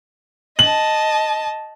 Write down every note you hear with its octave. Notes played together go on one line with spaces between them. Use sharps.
D#5 A5 F#7